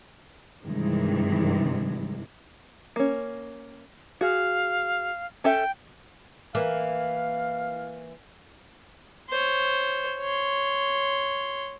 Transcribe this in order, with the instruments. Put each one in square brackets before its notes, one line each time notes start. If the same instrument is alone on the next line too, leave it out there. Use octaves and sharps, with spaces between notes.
[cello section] G2 C3 D#3 E3 G#3
[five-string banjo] A#3 C#4
[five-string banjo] F#4 G#4 [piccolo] F5
[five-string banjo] C#4 A4 E5 [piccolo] G5
[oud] E3 A#3 [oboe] F5
[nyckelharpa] C5 C#5
C#5 C6